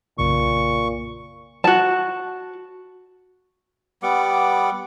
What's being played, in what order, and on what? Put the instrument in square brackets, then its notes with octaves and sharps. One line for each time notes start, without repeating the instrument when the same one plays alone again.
[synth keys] B1 F#2 C#3 [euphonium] A#2 [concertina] C#6
[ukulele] F#4 A5
[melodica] G3 B3 F#5 D6